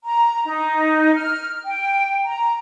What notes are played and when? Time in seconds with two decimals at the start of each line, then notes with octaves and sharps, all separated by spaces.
0.05 A#5
0.46 D#4
1.15 F6
1.66 G5
2.25 A#5